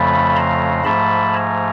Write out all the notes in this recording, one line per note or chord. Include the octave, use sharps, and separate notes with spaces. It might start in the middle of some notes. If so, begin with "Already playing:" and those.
Already playing: F2 C#3 F3 A3 A5 B5
A#5 C6
G#2 F3 A3 A5 B5
G#5 A#5